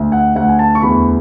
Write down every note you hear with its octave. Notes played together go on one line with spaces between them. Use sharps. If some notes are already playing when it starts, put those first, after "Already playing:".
Already playing: D2
F#5
D2 F#5
G#5
A5
C#6
E2 B5